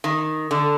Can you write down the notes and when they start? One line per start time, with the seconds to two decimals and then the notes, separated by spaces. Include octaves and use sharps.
0.04 D#3
0.51 D3